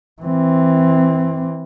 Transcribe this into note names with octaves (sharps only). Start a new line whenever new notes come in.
E3 C4